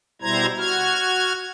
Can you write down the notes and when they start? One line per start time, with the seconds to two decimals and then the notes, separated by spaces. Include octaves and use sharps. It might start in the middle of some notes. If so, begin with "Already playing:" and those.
0.22 B2 G3 E4 C5 A#5 G#6
0.59 F#4 F6 G#6